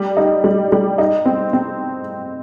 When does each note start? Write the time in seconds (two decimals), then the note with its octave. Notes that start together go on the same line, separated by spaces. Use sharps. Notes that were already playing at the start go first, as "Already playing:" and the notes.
Already playing: G3
0.17 D#4
0.44 G3
0.72 G3
0.98 D#4
1.26 C4
1.53 C4